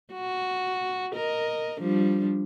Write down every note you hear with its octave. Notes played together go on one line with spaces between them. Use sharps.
F#4
A#4 D#5
F3 G3 D4